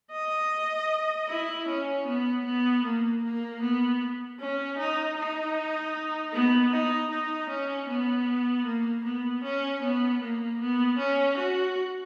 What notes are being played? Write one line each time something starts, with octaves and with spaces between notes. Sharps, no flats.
D#5
E4
C#4
B3
B3
A#3
A#3
B3
C#4
D#4
D#4
B3
D#4
D#4
C#4
B3
A#3
B3
C#4
B3
A#3
B3
C#4
F#4